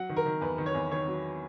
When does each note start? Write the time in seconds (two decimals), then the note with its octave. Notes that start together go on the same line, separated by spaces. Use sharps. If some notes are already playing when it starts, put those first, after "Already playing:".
Already playing: F#3 F#5
0.09 D#3
0.16 A#4
0.26 D#3
0.41 E2 B4
0.58 D#3
0.66 C#5
0.75 E2
0.91 D#3 C#5
1.08 F#3